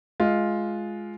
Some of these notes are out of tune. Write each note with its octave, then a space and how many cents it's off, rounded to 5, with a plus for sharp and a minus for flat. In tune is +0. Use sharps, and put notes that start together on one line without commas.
G#3 +15 F4 +0